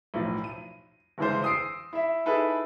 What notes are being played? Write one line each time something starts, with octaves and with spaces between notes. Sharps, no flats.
B1 A2 F3
D#7
G1 C#3 E3 G#3 C5
D#6 E6 C7 D7
E4 E5
D#4 E4 G#4 A4 B4